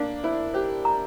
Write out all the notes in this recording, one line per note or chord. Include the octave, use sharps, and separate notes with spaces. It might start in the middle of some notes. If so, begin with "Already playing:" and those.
Already playing: A#3 D4 F5
E4 C5
G4 C5
A#5